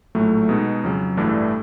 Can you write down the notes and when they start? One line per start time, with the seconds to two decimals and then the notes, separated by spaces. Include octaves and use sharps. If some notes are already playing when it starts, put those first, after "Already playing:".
0.15 A#1 A2 F#3 A3
0.49 B2 G#3 B3 D#4
0.83 F2 C#3 F#3
1.17 A1 G2 E3 A3 D4